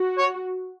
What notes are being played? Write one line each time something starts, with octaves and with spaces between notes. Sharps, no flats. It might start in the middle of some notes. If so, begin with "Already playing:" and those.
Already playing: F#4
C#5